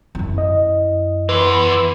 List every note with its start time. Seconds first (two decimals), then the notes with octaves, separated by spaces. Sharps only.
0.15 F#2 E4
0.38 D#5
1.29 E2 E3 B4 C6